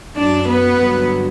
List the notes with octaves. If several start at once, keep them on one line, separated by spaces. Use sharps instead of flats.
F#2 F#3 D4 D5
B3 B4
G2 D3 F#3